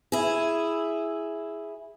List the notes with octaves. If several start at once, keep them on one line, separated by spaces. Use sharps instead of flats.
E4 G#4